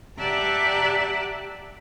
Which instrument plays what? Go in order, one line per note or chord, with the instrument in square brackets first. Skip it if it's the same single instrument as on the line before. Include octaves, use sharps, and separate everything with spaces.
[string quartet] G4 D5 E5 F#5 A5 A#5